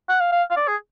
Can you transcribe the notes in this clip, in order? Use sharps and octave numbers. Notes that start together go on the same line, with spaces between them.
F#5
F5
F5
F5
D5
G#4